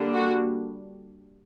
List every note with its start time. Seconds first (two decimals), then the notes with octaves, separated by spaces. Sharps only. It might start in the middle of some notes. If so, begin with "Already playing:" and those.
Already playing: D3 G3 A#3 D4
0.13 F#4